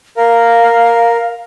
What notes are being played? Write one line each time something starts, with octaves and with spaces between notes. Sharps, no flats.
A#4 F5